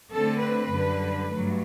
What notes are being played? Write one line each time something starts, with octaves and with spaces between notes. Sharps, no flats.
D3 A3 C4 A4
B4
F#2 D3 G3
G2 F#3 A3